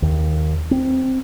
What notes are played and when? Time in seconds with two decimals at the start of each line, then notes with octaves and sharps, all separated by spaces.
0.02 D#2
0.71 C4